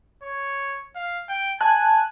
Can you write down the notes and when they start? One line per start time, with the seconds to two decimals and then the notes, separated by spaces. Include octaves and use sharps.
0.23 C#5
0.95 F5
1.29 G5
1.61 G#5 A5 F#6